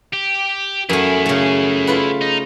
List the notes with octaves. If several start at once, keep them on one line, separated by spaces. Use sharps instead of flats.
G4
F#2 A3 E4 G#4
C#3 A3
F4 A4 B4
D#4